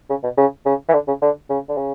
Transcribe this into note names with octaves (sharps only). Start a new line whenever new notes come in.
C#3
B2
C#3
C#3
E3
D3
C#3
D3
C#3
D3
C#3